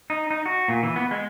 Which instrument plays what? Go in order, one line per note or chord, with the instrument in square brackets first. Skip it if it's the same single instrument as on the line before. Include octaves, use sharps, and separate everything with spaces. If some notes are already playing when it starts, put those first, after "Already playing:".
[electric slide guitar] D#4
D#4
F#4
A#2
E3
B3
G#3